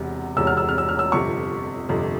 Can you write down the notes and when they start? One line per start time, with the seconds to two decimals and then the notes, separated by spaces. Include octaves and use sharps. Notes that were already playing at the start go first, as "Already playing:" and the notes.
Already playing: E1 E2 C3
0.37 E1 E2 C3 E6
0.47 F6
0.57 E6
0.69 F6
0.78 E6
0.89 F6
0.99 E6
1.12 G1 F2 C3 C#6
1.89 G1 F2 C3